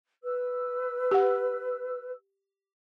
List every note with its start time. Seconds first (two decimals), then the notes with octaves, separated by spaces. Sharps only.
0.23 B4 E6
1.11 G4 F#5